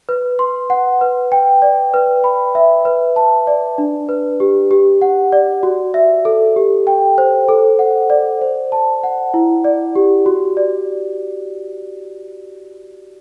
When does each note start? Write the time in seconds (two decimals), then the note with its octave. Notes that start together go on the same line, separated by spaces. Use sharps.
0.09 B4
0.39 C6
0.70 F#5
1.01 B4
1.32 G5
1.62 D5
1.94 B4
2.24 B5
2.55 E5
2.85 B4
3.16 A5
3.47 D5
3.78 D4
4.09 B4
4.40 G4
4.71 G4
5.02 F#5
5.32 D5
5.63 F#4
5.94 E5
6.25 A4
6.56 G4
6.87 G5
7.18 C5
7.49 A4
7.79 F#5
8.10 D5
8.41 C5
8.72 A5
9.03 F#5
9.34 E4
9.65 D5
9.96 G4
10.26 F#4
10.57 D5